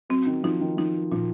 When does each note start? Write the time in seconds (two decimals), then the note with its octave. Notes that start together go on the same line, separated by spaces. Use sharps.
0.09 F#3 C4
0.26 D#3
0.43 F3 D#4
0.61 D#3
0.77 F3 D#4
1.12 A#2 F3